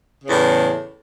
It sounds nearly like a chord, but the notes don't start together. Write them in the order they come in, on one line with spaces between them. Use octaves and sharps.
C#3 E2 A2